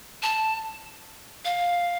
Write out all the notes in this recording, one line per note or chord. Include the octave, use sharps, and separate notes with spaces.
A5
F5